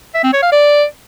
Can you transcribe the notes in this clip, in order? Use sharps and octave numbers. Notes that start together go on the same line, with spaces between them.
E5
C4
C#5
F5
D5